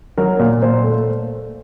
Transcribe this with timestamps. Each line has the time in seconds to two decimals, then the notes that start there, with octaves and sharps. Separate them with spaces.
0.18 F#3 A#4
0.39 A#2
0.62 A#2 C5
0.84 A3